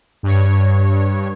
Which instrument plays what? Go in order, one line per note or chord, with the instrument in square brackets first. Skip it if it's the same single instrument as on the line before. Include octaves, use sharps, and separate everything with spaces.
[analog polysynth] G2 C#5